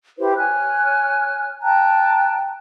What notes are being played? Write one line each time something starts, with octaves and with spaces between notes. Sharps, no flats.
E4 G4 B4 C5
C#5 G#5 F6 F#6
G5 A5 A#5 F#6